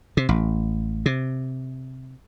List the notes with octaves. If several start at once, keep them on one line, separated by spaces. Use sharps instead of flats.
C3
A1
C3